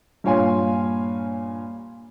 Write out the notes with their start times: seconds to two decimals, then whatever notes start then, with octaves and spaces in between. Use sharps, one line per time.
0.24 G2 A#2 C#5 F5 G#5 C6